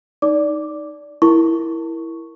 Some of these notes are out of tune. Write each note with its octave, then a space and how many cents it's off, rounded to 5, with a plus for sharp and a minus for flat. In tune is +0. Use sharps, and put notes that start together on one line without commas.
D#4 +0 D5 -10 D6 +0
E4 +0 A#4 +0 C#6 +0